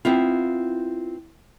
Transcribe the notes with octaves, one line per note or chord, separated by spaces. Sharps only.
B3 C4 E4 F4